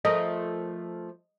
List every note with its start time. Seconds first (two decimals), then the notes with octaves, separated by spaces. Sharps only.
0.05 F3 A3 A#4 D#5